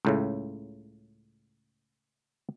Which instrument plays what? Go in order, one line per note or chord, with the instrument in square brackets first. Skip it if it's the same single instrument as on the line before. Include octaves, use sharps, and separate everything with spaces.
[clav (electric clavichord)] C#2 A2 C#3